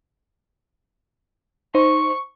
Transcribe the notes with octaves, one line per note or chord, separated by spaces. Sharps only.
D#4 C5 C#6